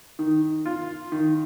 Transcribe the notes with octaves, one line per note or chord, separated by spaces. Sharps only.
D#3
F4
D#3